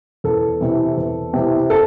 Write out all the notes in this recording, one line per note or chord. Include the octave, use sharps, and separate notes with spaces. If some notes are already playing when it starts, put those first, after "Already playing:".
E2 A4
C3 E3
E2
C3 E3
A4